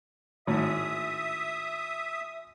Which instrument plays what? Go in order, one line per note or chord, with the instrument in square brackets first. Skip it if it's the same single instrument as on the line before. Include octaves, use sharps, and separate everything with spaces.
[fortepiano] G#1 A2 [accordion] E5 D#6